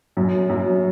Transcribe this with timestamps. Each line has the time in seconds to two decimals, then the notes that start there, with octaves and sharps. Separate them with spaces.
0.17 F#2
0.49 F#2